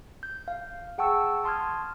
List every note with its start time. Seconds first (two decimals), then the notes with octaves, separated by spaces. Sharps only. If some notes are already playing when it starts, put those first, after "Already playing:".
0.23 G6
0.48 F5
0.98 G#4 F#5 G5 A5 C#6 E6
1.44 A5 C6 D#6 F6 G#6